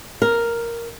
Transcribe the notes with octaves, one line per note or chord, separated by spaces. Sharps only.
A#4